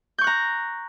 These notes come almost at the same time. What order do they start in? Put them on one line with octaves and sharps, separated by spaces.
G6 C#6 F#6 A#5